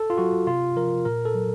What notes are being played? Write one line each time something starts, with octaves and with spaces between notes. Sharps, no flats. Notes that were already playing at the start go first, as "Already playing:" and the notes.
Already playing: A4
F4
F#3 F#4
C3 F4
F3 A#4
A#2 A#4
A4
F#3